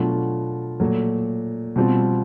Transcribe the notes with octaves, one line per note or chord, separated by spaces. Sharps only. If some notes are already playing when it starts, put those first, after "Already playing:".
Already playing: B2 F#3 A3 D4 F4
A#2 F#3 A3
B2 G3 C4 F4